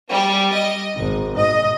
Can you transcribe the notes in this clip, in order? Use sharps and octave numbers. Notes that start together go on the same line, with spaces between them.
G3
D#5
G#1
D#5